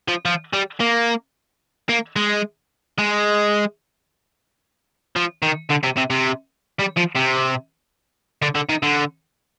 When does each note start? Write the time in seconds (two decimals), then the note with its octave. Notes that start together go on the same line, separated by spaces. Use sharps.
0.08 F3
0.25 F3
0.53 G3
0.80 A#3
1.89 A#3
2.16 G#3
2.98 G#3
5.16 F3
5.43 D#3
5.70 D3
5.84 C3
5.97 C3
6.11 C3
6.79 G3
6.97 F3
7.15 C3
8.42 D3
8.55 D3
8.69 D#3
8.83 D3